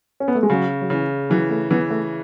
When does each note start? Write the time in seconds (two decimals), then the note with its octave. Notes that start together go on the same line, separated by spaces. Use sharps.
0.20 C#4
0.28 B3
0.35 A3
0.43 G#3
0.50 C#3 F#3
0.82 F#3
0.90 C#3 E3
1.30 E3 F#3
1.50 A3
1.70 E3 B3
1.90 A3